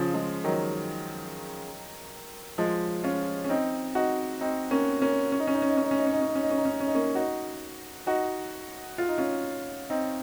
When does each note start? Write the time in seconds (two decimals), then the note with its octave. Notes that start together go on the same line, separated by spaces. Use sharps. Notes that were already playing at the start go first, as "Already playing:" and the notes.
Already playing: C#3 F3
0.14 F3 G#3
0.44 D#3 F#3
2.58 F3 G#3
3.04 C#4 F4
3.44 C#4
3.49 C4 D#4
3.95 D#4 F#4
4.41 C4 D#4
4.71 A#3 C#4
5.02 A#3 C#4
5.32 C#4
5.40 D#4
5.47 C#4
5.54 D#4
5.62 C#4
5.70 D#4
5.77 C#4
5.84 D#4
5.91 C#4
5.99 D#4
6.07 C#4
6.13 D#4
6.21 C#4
6.28 D#4
6.35 C#4
6.43 D#4
6.50 C#4
6.58 D#4
6.65 C#4
6.73 D#4
6.80 C#4
6.88 D#4
6.95 A#3 C#4
7.15 D#4 F#4
8.07 D#4 F#4
8.98 F4
9.09 D#4
9.18 C#4 F4
9.90 C4 D#4